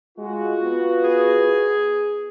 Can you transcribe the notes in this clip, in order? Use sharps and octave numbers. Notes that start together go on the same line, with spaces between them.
G#3 F4 F#4
B3
G#4